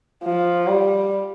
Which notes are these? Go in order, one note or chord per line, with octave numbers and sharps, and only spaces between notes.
F3
G3